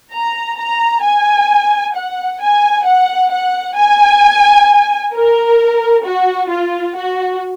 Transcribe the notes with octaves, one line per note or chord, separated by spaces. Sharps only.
A#5
A#5
G#5
F#5
G#5
F#5
F#5
G#5
A#4
F#4
F4
F#4